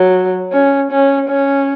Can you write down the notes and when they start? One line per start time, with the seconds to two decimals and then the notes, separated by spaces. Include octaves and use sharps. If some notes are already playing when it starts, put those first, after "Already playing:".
Already playing: F#3
0.52 C#4
0.91 C#4
1.29 C#4